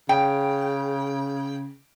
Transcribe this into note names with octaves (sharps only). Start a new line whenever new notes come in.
C#3 G5